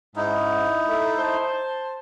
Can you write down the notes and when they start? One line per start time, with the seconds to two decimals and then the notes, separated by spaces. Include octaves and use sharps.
0.16 G#2 C#4 D#4 E4
0.88 A3 A4
1.18 C5 A5